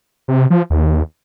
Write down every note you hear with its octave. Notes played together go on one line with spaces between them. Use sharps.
C3
F3
D#2